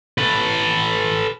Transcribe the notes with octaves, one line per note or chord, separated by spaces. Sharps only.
A4 B4